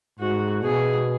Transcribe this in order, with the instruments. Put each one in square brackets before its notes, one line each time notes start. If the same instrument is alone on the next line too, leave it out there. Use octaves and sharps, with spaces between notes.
[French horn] G#2 [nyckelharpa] F#4
[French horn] B2 [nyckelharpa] G#4